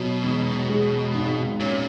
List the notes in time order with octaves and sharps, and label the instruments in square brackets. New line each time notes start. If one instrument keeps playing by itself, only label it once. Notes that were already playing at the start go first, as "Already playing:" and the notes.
Already playing: [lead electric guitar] B2 [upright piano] F#3
[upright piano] E1
G#3
G#1
[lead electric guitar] A#2 [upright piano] C#4